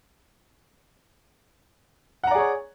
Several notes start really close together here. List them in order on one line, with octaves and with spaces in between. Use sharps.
F#5 A#5 D5 G#4 C#5